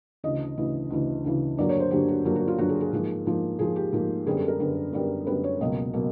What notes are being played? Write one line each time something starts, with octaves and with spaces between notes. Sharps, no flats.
D2 C#3 E3 D#5
D2 C#3 E3
D2 C#3 E3
D2 C#3 E3
G2 D3 F#3 A#3 D5
C#5
C5
G2 D3 F#3 A#3 G4
F#4
G2 D3 F#3 A#3 F4
F#4
F4
G2 D3 F#3 A#3 F#4
G#4
G#4
G#2 F3 A#3
G#2 F3 A#3
G#2 F3 A#3 G#4
G4
G#2 F3 A#3
F#2 D3 G3 B3 G#4
A4
A#4
F#2 D3 G3 B3
F#2 D3 G3 B3
F#2 D3 G3 B3 B4
C#5
C#2 B2 F#3 A#3 D#5
B2 F#3 A#3